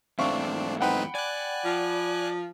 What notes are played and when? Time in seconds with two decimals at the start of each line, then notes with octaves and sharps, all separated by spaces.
0.19 E2 G#2 A3 C4 D4 E5 F5 C#6
0.81 C4 D#4 B4 F#5 G5 B5
1.15 D5 G#5 F#6
1.64 F3